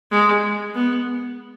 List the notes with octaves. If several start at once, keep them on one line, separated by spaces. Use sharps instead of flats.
G#3
B3